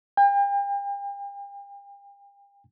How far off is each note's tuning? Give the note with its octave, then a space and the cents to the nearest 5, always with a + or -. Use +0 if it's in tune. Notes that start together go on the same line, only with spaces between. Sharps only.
G5 +40